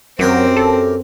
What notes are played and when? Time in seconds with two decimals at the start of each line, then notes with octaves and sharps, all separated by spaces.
0.19 F#2 F#3 C4 G4 A#4
0.56 A4